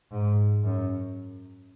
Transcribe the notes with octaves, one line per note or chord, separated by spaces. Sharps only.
G#2
F#2